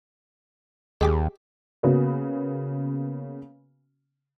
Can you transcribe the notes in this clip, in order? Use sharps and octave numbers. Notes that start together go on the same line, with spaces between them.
D#2 G#3 G4 D6
C#3 A#3 B3 C#4 F#4 B4